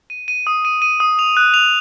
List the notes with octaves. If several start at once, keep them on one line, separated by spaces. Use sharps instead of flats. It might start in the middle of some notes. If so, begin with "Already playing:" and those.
D#7
D#7
D#6
D#7
D#7
D#6
F7
F#6
F7